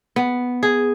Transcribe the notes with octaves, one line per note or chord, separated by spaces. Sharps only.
B3
G#4